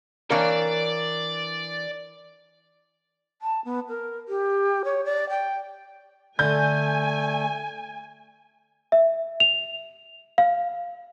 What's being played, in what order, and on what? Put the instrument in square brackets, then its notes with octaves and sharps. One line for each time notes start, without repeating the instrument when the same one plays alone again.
[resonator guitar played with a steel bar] E3 D4 C#5 [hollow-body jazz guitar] A#4 F5 [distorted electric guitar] D5
[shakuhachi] A5
B3
A#4
G4
C#5
D5
G5
[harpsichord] D3 [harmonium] A3 [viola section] G#5 [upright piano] G6
[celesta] E5
F7
F5